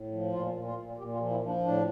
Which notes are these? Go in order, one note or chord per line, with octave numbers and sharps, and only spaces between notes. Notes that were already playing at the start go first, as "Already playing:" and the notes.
Already playing: A2
F3
A#2 F4
A#2
F4
A#2
A#2 G4
F4
F3
E4
F3
D4
A2 D4